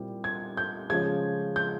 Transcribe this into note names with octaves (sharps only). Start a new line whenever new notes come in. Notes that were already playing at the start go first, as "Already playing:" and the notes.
Already playing: A#2 G3 C4 E4
G#6
G6
C#3 F3 G#3 C#4 F4 G#6
G6